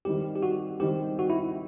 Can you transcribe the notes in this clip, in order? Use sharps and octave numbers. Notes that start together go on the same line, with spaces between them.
D#3 G3 C4 G4
G4
F#4
D#3 G3 C4 G4
F#4
E4